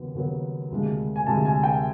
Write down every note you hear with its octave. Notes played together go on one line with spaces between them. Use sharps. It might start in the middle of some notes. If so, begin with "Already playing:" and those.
Already playing: D#2 C#3 F#3 B3
D#2 C#3 F#3 B3
D2 C3 F3 G#3
G#5
D2 C3 F3 G#3 A5
G#5
G5